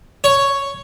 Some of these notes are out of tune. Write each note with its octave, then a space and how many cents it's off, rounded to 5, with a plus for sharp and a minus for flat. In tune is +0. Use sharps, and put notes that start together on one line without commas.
C#5 +0